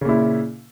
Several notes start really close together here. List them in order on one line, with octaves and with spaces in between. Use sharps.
C#3 A#2 E4